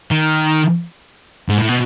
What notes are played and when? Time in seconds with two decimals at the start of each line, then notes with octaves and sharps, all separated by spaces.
0.11 D#3
1.49 G#2
1.58 A2
1.69 B2